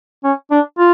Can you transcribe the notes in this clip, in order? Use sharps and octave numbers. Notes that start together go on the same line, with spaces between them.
C#4
D4
F4